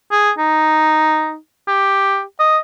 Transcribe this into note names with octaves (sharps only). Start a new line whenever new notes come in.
G#4
D#4
G4
D#5